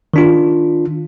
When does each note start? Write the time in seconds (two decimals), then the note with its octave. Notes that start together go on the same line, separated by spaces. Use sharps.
0.14 D#3 D4 F4